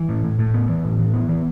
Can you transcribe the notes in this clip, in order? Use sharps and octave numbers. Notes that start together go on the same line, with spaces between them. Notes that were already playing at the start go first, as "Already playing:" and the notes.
Already playing: E3
A2
A2
A2
B3
E3
A2
E3
B3
E3